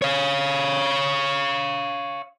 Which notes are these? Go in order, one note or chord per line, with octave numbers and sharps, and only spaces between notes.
C#5 F5